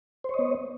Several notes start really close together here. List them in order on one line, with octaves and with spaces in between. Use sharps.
C5 C#5 D#5 B3